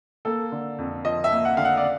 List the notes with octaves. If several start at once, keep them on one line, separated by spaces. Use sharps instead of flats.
A#3 A4
D3
F2
F3 D#5
E5
A#3
F#5
D3 F5
F#5
D5